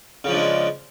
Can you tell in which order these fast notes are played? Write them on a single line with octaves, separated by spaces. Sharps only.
C#3 F3 D4 G#3